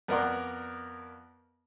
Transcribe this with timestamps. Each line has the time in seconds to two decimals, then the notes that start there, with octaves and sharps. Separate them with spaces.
0.08 F2 B3 A#4 D5 F#5 C6